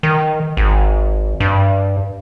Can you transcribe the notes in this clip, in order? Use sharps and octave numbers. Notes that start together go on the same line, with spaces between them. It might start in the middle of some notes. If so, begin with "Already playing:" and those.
D#3
G#1
G2